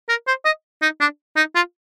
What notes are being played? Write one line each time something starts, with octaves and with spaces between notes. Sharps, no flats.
A#4
C5
D#5
D#4
D4
D#4
F4